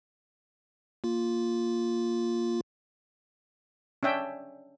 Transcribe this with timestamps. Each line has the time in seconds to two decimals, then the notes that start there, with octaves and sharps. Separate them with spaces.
1.04 A#3 F4
4.03 C#4 D4 E5 G5